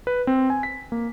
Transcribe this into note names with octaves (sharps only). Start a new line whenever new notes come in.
B4
C4
G#5
B6
A#3